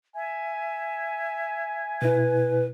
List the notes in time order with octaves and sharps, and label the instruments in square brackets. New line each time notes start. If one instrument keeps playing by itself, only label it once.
[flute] E5 [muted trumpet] G#5
[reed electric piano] B2 E4 [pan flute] B4